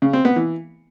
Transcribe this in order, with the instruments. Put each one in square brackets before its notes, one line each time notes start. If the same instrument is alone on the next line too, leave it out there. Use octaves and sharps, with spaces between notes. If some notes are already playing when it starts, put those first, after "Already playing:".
[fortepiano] C#3
C4
B3
E3